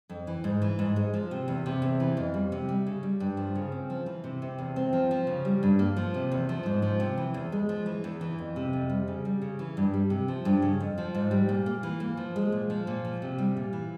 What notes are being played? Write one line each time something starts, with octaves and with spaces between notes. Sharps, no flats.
F2
E3
G#2
E3
G#2
G#3
F3
C3
E2
C3
E2
E3
F2
G3
C3
G3
C#3
G3
G2
F3
C#3
C4
F3
E3
C3
C3
E2
C4
F3
F3
C#3
G3
G2
A#3
F3
C3
E2
F3
G#2
F3
C3
E3
E2
G#3
F3
E3
E2
E3
F2
C3
F2
G3
C#3
G3
C#3
E3
G2
G3
C3
F3
G2
C#3
F2
F3
G#2
G3
A#2
A#3
E3
A#3
F3
G#3
A#2
F3
A#2
F3
C3
G3
A#2
E3